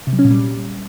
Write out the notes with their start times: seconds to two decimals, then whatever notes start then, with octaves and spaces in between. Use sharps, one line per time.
0.07 C3
0.13 F#3
0.19 C#4
0.25 A#2
0.31 G3